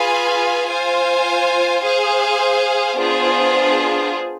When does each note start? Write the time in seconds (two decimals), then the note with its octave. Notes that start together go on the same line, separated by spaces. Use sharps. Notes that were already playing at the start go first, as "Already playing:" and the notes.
Already playing: F4 G#4 B4 F5 G#5
0.68 F4 C5 F5 G#5
1.83 G#4 C5 F5 G#5
2.99 B3 D4 F4 G#4 C5